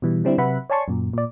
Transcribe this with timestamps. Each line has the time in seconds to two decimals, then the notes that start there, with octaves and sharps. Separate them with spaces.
0.02 B2 E3 G3
0.24 D3 G3 C4 D4 E4
0.38 C3 F#3 B4 E5 F#5 B5
0.70 C#5 D5 G#5 A5 C6 C#6
0.88 F#2 A#2
1.13 A#2 D5